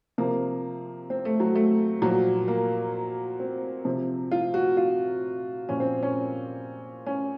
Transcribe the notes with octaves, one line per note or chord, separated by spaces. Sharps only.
C3 F3 A#3
C4
A3
F#3
A3
A#2 F3 F#3
A#3
C4
C3 F3
F4
F#4
F4
A#2 F3 C#4
C4
C#4
C#4